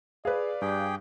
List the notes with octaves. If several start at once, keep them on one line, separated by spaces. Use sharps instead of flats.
G#4 B4 D5 F5
G2 G4 G#4 G5